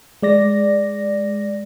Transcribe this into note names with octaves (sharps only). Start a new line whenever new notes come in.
G#3 D5 A#6